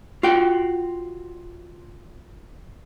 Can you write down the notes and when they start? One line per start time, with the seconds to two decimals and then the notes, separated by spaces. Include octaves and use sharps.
0.23 F4 F#4 G5